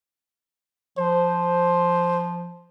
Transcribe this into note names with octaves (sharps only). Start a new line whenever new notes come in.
F3 C5